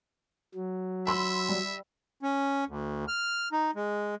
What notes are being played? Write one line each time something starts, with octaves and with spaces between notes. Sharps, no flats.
F#3
E5 B5 C6 E6
G3
C#4
D2
F6
D#4
G#3